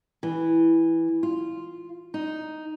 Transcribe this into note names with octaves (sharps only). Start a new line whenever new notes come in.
E3
F4
D#4